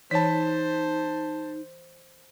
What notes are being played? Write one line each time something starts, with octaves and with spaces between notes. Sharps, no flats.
E3 D#4 C5 C#5 A5 B5 B6